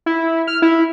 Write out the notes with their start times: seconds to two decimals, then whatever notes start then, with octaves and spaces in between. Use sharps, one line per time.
0.06 E4
0.47 F6
0.62 E4